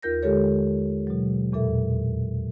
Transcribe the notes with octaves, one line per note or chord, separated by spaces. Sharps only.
D#2 F4 A#4 G6 A#6
D3 G#3 G4 A4 C#5
B2 F#3
E2 A#2 A4 E5